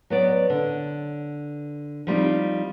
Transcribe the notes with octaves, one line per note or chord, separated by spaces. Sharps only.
F#3 B3 D5
D3
F3 G3 C4 D#4